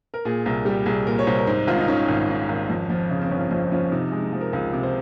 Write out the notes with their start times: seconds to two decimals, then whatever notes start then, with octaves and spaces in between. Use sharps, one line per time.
0.14 A#4
0.25 A#2 G#4
0.45 C2 A#4
0.65 G3 G4
0.86 C2 G#4
1.07 A#2 A#4
1.19 C#5
1.27 C2 C5
1.38 A#4
1.47 G#2 C5
1.67 G#1 F4
1.78 D#4
1.88 D#3 C#4
2.08 G#1
2.29 G#2
2.49 G#1
2.70 F2
2.90 F3
3.10 C#3
3.22 C4
3.30 G1 C#4
3.51 F2 C4
3.71 F3 C#4
3.92 C3 D#4
4.12 G#3
4.22 D#4
4.32 F3
4.41 A#4
4.53 C#2 G#4
4.73 C3
4.83 C5